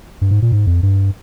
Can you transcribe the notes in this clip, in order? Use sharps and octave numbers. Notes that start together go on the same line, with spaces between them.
G2
G#2
A#2
G#2
F2
G2